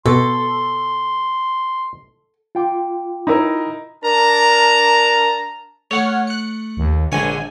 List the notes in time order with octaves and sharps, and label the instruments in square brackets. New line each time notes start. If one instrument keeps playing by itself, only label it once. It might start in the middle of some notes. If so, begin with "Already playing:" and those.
[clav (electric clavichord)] B2 [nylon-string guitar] A4 [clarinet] C6
[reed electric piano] F4 G5 D6
[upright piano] D#4 E4 A#4
[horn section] D4 A#4 A5 A#5
[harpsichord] A3 [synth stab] C#5 F#5 F6
[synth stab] F#6 C#7
[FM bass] D#2
[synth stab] A#1 G#5 [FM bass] D3 [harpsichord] G#3 C#5